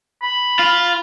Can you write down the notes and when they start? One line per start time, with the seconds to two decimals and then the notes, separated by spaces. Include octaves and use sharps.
0.23 B5
0.59 F4